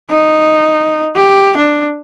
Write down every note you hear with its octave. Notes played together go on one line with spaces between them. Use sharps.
D#4
G4
D4